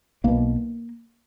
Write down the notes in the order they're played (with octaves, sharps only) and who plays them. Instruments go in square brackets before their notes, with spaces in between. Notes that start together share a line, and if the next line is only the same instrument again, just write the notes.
[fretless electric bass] B1 B2 A#3